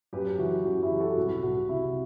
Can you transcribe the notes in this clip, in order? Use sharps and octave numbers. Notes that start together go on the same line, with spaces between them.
F#2 G4 B4
E3 F#4
F#2 F#4
E4 G4
E3
F#4 A4
C2 F#4
C2 F#4
C3 E4